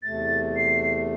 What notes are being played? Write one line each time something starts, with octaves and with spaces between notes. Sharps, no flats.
E2 C3 A3 A6
C7